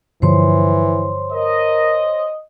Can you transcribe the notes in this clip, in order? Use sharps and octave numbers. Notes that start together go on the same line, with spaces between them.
G2 D3 E3 F3 C5 C#5 C6
A#4 D#5